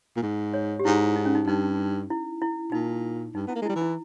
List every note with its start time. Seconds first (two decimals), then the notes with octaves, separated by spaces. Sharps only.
0.17 A#2
0.23 G#2
0.54 C#5
0.79 G4
0.85 G#2 E4
1.16 D#4
1.26 C#4
1.35 D#4
1.47 G2 D#4
2.10 E4
2.42 E4
2.72 A#2 D#4
3.35 G2 D#4
3.48 B3 E4
3.55 A#3
3.62 G#3
3.66 G3 E4
3.76 E3
3.82 E4